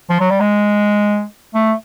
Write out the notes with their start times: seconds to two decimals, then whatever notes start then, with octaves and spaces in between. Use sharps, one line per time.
0.10 F3
0.20 F#3
0.31 G3
0.40 G#3
1.54 A3